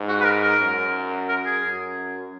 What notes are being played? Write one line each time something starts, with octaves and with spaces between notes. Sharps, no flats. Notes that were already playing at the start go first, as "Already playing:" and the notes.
Already playing: G#2
F#4
B4
A#4
A#4
F#2
A#4
G#4
F#2